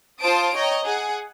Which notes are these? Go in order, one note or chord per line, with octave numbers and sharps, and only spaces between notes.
F4 C5 A5 D#6 D7
C#5 D#5 G5 A#5
G#4 F#5